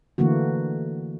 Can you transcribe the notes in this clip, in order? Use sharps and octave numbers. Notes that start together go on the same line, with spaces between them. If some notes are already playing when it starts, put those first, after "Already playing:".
D3 E3 A3 A#3 F#4